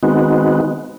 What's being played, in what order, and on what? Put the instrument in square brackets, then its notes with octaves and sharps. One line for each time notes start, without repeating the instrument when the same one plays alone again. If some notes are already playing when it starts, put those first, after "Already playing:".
[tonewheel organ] D#3 G#3 B3 C4 D#4 F#4